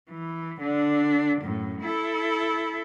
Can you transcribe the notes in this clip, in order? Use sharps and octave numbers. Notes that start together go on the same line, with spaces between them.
E3
D3 D4
F#2 A2
E4 A4